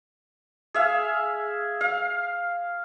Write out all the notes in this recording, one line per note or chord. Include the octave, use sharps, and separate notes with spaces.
G#4 E5 F5
F5